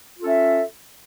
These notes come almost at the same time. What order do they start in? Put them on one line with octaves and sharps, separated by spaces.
F4 A4 C#4 E5